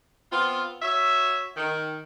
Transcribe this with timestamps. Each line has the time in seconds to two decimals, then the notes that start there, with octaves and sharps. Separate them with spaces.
0.32 B3 C4 F4
0.82 F#4 C#5 E5
1.57 D#3